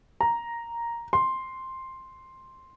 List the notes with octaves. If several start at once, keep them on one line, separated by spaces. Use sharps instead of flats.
A#5
C6